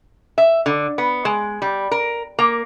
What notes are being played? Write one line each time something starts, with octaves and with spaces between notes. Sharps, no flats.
E5
D3
B3
G#3
G3
A#4
A#3